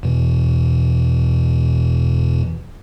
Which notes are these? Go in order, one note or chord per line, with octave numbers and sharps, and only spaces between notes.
E2 B2 E3